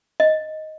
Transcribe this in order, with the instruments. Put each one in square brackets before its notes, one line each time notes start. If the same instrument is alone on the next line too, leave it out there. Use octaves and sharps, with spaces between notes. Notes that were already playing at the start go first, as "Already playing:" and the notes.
[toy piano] D#5